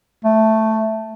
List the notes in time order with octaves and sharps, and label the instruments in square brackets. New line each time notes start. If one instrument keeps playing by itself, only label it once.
[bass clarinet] A3